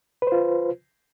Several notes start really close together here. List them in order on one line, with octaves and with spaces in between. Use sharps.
B4 C5 F4